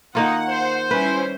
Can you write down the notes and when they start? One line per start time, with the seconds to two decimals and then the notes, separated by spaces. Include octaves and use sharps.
0.15 D#3 A#3 D#4 F4 F#5
0.48 C5
0.91 G3 C#4 E4 B4